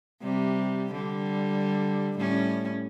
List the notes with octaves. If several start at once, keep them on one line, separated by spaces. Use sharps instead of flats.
C3 G3
D3 G3
A2 G3 C#4